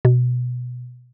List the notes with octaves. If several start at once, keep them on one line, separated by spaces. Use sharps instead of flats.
B2